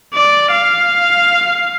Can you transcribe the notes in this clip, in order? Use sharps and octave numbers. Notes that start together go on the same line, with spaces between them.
D5
F5